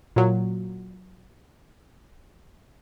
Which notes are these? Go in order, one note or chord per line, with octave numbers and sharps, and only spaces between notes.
A#2 F#3